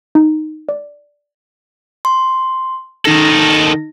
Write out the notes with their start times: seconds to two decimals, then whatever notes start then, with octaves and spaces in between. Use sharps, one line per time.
0.15 D#4
0.69 D5
2.05 C6
3.05 D#3 D#4 A4 A#6